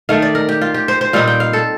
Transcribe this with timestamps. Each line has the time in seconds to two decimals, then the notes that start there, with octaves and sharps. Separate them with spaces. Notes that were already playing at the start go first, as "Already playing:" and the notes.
0.09 D#3 A3 D#4 F5
0.22 D5
0.35 A#4
0.49 G4
0.61 F4
0.74 G4
0.88 C5
1.01 C5
1.13 A#2 G3 C4 D#4 F5
1.27 G5
1.40 F5
1.53 A4